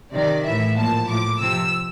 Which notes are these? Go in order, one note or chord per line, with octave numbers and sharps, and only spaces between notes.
C3 D#3 D5
A2 E3 E5
A#2 F3 A5
A2 F3 D6
C3 F3 E6